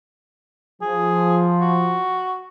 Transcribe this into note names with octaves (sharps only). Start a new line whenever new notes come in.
F3 G#4
F#4